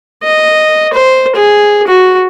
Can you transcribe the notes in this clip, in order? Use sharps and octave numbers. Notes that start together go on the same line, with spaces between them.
D#5
C5
G#4
F#4